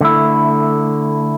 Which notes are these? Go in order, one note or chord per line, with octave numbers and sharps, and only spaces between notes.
D3 A3 E4